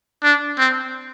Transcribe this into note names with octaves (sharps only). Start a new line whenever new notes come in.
D4
C4